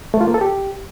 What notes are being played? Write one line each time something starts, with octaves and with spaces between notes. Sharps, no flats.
A3
F4
A#3
A4
G4